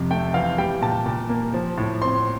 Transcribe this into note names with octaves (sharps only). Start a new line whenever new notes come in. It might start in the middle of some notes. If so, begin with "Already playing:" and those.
Already playing: F2 C3
A3 G5
E3 F5
G3 G5
A#2 A5
A#2
A#3
F3
A2
C4 C6